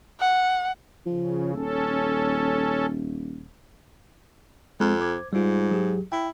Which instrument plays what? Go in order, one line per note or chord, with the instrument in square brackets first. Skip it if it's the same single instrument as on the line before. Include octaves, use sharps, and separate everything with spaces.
[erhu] F#5
[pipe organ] C#3 [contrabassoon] F3
[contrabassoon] D#1 [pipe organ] C#4 A4
[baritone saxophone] F2 [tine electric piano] G#3 C4
[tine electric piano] C5 D6 G#6
[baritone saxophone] G#2 [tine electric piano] G3 F4
[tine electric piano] F#3 G4 G#4
[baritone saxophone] E4 [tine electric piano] G5